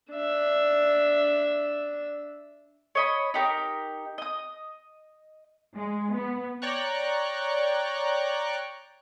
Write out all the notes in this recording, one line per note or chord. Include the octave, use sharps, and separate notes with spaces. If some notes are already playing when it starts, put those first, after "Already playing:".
D4 E5
C#5 D#5 B5
D#4 G4 A#4
D#5 D#6
G#3
B3
C#5 D5 G5 A#5 C#6 F#6